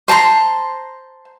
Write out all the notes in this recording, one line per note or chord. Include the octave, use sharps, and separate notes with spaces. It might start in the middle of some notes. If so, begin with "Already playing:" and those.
C5 A5 A#5 C6